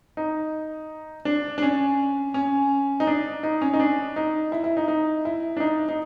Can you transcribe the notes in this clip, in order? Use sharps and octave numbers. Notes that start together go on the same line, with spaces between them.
D#4
D4
D4
C#4
C#4
D#4
D4
D#4
C#4
D#4
D4
D#4
E4
E4
D#4
D#4
E4
D4
D#4
D#4